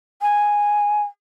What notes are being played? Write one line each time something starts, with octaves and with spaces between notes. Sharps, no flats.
G#5